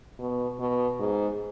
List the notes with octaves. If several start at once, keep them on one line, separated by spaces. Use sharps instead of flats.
B2
B2
G#2